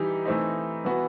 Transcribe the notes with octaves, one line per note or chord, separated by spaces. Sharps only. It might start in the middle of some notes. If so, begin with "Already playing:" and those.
Already playing: E3 G3 D#4 G4
E3 A3 C4 D#4
E3 B3 F#4